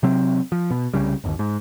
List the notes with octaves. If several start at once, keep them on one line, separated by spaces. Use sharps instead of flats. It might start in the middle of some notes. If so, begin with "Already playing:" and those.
C3 F#3 C4
F3
B2
C2 C#3 G3
G1 D#2
G#2